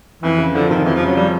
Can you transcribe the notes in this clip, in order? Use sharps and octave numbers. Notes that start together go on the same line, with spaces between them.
F2 E3
C#3
D3 F3
F1 D#3
F2 E3
F3
C#3
F#3
F3 G3